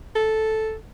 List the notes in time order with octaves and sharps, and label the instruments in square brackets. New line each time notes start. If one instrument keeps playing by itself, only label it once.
[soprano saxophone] A4